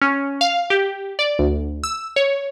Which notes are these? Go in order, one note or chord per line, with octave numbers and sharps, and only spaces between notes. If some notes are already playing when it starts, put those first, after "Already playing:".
C#4
F5
G4
D5
D2
E6
C#5